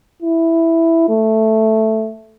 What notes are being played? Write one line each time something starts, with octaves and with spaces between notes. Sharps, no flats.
E4
A3